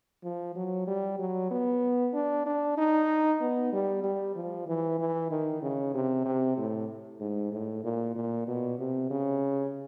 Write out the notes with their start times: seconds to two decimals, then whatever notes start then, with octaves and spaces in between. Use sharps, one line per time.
0.24 F3
0.55 F#3
0.87 G3
1.19 F#3
1.51 B3
2.14 D4
2.46 D4
2.78 D#4
3.41 B3
3.73 G3
4.04 G3
4.35 F3
4.67 E3
4.99 E3
5.31 D#3
5.62 C#3
5.94 C3
6.25 C3
6.57 A2
7.21 G#2
7.52 A2
7.84 A#2
8.15 A#2
8.47 B2
8.79 C3
9.11 C#3